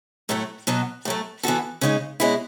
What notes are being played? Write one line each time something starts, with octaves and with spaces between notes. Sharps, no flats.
A2 F#3 A3 E4
B2 F#3 B3
A2 F#3 A3
E3 B3 F#4 A4
C#3 G#3 D#4
B2 G#3 C#4 E4